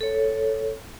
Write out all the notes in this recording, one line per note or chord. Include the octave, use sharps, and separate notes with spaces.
A4 C#5